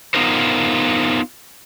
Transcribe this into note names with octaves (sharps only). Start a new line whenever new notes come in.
B3 D#4 F4 A#4 C5